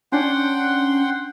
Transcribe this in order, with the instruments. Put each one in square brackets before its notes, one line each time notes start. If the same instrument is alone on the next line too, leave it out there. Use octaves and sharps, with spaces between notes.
[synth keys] C#4 D4 [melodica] F#5 G5 C6